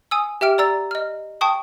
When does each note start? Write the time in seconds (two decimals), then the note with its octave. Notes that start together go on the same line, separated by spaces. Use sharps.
0.11 G#5 D#6 E6
0.41 G4 E5 G5 F6 D7
0.58 D5 A#5 E6 A6
0.91 D#5 F6
1.41 G5 A5 C#6 D#6